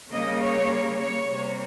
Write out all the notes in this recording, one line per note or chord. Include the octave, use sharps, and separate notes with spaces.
C#3 G3 A#3 D#5
C#5
C#5
C3 G3 A#3